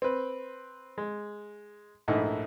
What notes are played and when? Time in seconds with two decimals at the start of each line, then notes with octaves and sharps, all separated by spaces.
0.02 C4 B4
0.98 G#3
2.08 A#1 G#2 A3 E4 D#5